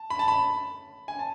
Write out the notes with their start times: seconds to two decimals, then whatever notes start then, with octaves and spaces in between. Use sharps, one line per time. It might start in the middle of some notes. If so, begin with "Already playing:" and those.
Already playing: A5
0.10 B5
0.19 A5
0.28 B5
1.08 G#5
1.19 A5